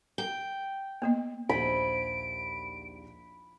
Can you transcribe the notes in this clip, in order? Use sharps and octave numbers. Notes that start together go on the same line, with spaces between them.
G5
A#3 B3 D#5
A#1 D#2 F3 D#4 E4 B5 D7